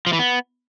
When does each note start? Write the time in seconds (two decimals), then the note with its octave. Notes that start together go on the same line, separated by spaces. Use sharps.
0.07 F3
0.13 E3
0.19 B3